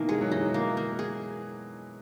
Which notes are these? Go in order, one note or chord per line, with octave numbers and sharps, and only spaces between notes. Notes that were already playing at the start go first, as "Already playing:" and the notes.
Already playing: B2 D#3 E3 A#3 D#4
G#3 G#4
F#3
E3 D#4
A#3
A#3
G#4